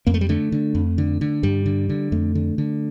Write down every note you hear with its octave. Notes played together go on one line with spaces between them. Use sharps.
F2 A#3
A3
G3
D3 A3
D3
F2
D3
D3
G2 G3
D3
D3
F2 A3
D3
D3